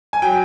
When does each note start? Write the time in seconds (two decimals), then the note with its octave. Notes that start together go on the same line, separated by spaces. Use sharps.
0.13 G#5
0.22 F#3 G5